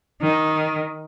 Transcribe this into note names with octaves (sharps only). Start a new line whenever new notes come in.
D#3